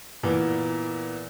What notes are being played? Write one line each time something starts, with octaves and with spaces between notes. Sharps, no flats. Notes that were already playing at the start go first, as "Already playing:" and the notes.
A#2 E3 A#3 B3